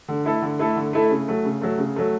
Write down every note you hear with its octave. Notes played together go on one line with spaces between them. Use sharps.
D3
A3 E4 A4
D3
A3 E4 A4
D3
A3 E4 A4
C#3
F#3 A3
C#3
F#3 A3
C#3
F#3 A3